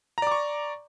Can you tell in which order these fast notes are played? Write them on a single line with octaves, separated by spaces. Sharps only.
A#5 D5 D6 C#6